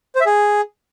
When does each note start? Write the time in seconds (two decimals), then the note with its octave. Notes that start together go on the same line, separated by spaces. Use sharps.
0.15 C5
0.21 E5
0.26 G#4